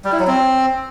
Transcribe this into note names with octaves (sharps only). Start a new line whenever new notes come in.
G3
E4
F#3
C4